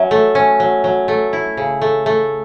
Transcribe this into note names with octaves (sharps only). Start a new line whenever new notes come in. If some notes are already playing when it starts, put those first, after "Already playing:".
Already playing: F#3 C#4 E5
A3
C#4
F#3
F#3
A3
E4
C#3
A3
A3